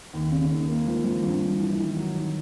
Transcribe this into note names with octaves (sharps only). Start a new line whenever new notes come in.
D#2
C#3
D#2
A#3
F3
F3
G2
G2
E3
D#3
F#3
D#3